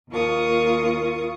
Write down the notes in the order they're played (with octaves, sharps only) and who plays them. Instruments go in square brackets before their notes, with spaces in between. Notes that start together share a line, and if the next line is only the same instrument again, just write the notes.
[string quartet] D#2 F4 A#4 C#6 D#6